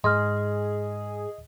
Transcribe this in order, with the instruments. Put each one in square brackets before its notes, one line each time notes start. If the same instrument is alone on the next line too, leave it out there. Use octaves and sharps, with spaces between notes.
[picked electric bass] G#2 [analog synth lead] G#4 [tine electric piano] D#5 [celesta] C6 F6